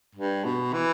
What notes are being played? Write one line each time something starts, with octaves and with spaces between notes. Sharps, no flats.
G2
B2
E3